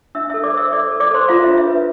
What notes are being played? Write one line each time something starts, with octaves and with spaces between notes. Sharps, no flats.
D4 E5 E6
A4 E5 E6
D5 D6
C5 E5 E6
A4 D5 D6
A4
D5 D6
A4 C5 C6
F4 F5
D4 E5
E5
B4